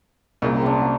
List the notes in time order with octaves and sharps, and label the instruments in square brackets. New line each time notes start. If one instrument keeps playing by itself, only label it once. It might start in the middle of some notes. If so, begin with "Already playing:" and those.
[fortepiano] C2 A#2 [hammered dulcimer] F#2 C#3 A#3
[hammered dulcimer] C4 D4
F#4